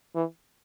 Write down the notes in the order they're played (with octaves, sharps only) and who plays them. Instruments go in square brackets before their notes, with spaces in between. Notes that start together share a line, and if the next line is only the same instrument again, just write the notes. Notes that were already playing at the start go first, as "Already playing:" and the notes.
[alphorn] E3